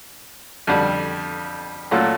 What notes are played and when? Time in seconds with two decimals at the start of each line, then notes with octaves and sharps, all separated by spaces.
0.67 F2 D3 G3
1.91 A#2 F#3 A3 C#4 F4